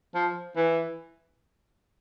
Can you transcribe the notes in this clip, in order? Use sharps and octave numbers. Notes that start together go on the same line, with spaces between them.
F3
E3